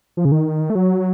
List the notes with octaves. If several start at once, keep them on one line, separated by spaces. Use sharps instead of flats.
F3
C#3
D#3
A3
F#3